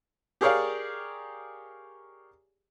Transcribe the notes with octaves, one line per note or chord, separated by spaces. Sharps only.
G4 G#4 A#4 C#5 D5 F5